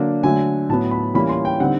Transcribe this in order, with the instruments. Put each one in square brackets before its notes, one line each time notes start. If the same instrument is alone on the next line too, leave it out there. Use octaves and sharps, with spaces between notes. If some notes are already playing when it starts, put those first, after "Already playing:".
Already playing: [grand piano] D3 F#3 A#3 D4
D3 F#3 A3 G#5
A2 F#3 B3 A5
B5
E3 G3 A#3 C#4 B5
C6
G5
D3 G3 C4 D#4 F#5